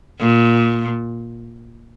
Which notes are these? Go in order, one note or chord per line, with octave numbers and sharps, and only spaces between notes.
A#2